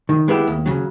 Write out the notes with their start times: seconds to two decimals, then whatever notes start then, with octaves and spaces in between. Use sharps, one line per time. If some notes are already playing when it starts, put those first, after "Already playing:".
0.09 D#3
0.28 G#3 B3 E4 G4
0.47 D#2
0.66 C#3 F#3